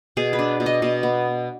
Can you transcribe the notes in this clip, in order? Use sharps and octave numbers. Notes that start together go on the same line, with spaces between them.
B2 G#4
B4
D4
B2
D#5
B2
B3